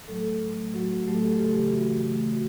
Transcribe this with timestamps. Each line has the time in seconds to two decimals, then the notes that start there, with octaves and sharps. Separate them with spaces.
0.07 A2 F#3 A3 A4
0.41 A2 F#3 A3
0.73 A2 F#3 A3 F#4
1.07 A2 F#3 A3 G4
1.15 A4
1.23 G4
1.32 A4
1.39 C#3 E3 A3 G4
1.72 C#3 E3 A3 F#4
2.05 C#3 E3 A3
2.33 F#4